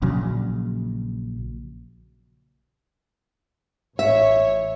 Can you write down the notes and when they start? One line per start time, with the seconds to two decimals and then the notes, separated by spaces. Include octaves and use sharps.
0.02 A#1 A#2 C#3 F#3
3.99 A1 C#5 E5